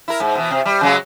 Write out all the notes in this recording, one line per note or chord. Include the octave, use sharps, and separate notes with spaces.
E4 A#4
G#2
B2 E3
C3
G3
C#3 F#3 G#3